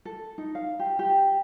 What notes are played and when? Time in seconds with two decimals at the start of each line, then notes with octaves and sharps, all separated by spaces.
0.05 A4
0.38 D#4
0.55 F5
0.79 G4
0.99 G4